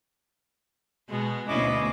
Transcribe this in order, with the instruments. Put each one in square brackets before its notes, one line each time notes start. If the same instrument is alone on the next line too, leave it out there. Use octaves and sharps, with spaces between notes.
[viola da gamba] B2 G#3 B3
[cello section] D2 B2 [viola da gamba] C#4 E4 [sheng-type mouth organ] D#5 D6